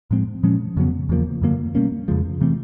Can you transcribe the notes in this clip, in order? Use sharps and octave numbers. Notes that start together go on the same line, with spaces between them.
A2 F3 G#3 C4
A#2 F3 G#3 C#4
F2 C#3 F#3 B3
E2 C#3 F3 A#3
F#2 D3 F#3 A#3
B2 G3 A#3 C#4
F2 C#3 F3 G#3
C3 E3 A3 C4